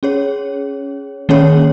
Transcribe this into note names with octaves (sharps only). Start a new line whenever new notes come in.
C#4 G#4 C#5
D#3 A#3 C#4 G#4 C#5